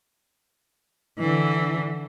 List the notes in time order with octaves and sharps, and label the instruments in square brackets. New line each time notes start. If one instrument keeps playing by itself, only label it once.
[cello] D3 E3